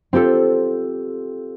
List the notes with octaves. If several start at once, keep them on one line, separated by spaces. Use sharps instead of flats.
C4 F4 G4 A4